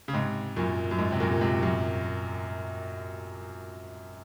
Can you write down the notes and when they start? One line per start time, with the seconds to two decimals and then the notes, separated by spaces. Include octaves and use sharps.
0.08 C#3
0.14 G#2 C3
0.56 F#2 A#2
0.91 F#2
0.99 G#2
1.12 C3
1.20 F#2 A#2
1.31 A#2
1.41 G#2 C3
1.63 F#2 A#2